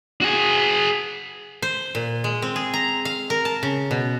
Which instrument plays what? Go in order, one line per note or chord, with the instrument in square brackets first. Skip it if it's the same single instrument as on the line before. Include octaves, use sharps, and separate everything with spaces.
[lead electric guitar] F#4 G#4
[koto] C5
A#2
G#3
C4
G#4
A#5
F5
A#4
A5
C#3
B2